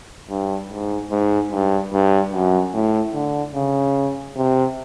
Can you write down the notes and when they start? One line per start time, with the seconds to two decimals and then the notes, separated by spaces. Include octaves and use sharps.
0.30 G2
0.70 G#2
1.11 G#2
1.52 G2
1.93 G2
2.33 F#2
2.74 A2
3.14 D3
3.55 C#3
4.37 C3